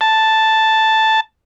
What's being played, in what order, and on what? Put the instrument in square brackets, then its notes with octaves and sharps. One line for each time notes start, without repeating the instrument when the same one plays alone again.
[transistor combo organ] A5